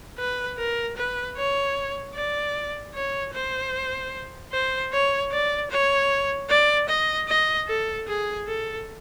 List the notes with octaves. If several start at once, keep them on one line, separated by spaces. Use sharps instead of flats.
B4
A#4
B4
C#5
D5
C#5
C5
C5
C#5
D5
C#5
D5
D#5
D#5
A4
G#4
A4